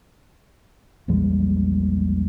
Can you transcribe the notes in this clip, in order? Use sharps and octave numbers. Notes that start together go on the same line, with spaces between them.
A#1 E2 G3 G#3